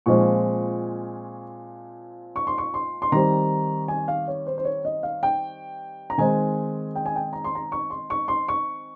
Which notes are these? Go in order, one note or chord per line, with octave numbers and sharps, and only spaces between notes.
A#2 F3 G#3 C4 C#6
C#6
C6
C#6
C6
C6
D#3 G3 C4 A#5
G#5
F5
C#5
C5
C5
C#5
D#5
F5
G5
A#5
D#3 G#3 C4 G#5
G5
G#5
G5
A#5
C6
A#5
C#6
C6
C#6
C6
C#6